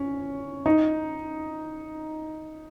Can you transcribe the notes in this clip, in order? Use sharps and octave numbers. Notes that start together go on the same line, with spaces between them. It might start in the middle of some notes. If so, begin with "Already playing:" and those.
Already playing: C#4
D#4